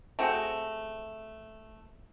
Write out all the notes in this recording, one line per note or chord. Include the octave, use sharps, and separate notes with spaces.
A3 C4 F#4 G#4